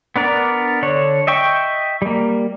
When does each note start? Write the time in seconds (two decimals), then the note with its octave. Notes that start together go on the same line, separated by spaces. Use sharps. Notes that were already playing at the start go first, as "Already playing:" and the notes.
0.16 B3 D4 A#4 D5
0.83 D3 D4 C#5
1.27 D#5 E5 G5 C#6
2.02 G3 A#3